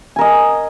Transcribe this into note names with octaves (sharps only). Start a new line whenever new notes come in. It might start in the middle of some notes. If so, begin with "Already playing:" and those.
A#4 D#5 G#5